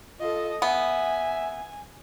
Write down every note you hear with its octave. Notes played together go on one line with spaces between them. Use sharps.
F4 A4 D#5
B3 E5 G#5